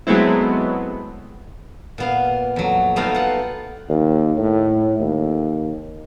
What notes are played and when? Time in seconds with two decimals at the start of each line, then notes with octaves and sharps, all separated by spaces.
0.07 F#3 G#3 A3 B3 C4 E4
1.98 A#2 B3 F5
2.56 F2 F#3
2.96 G3 A3 B3 D#4 D#5 F5
3.14 F4 F#5
3.89 D#2
4.38 A2
5.00 D#2